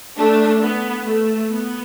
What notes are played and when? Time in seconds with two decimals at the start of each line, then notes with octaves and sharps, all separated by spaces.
0.17 A3 D4
0.62 B3
1.07 A3
1.51 B3